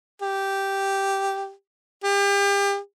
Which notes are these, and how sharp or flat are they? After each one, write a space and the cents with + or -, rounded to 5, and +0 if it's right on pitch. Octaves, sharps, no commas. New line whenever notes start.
G4 -5
G4 +35